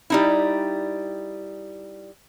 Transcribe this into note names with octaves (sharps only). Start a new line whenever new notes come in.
G3 D#4 E4